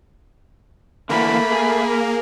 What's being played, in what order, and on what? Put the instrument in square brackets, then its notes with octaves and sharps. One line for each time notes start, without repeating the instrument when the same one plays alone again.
[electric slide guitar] D3 E3 F#4 [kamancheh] A3 B5 [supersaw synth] A#3
[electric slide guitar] G#4
[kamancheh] A#4